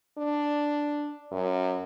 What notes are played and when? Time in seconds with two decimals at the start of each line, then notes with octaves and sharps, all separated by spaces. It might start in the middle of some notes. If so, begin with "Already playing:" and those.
0.18 D4
1.31 F#2